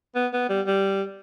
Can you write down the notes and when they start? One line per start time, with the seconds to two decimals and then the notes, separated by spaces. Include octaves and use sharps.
0.15 B3
0.33 B3
0.49 G3
0.67 G3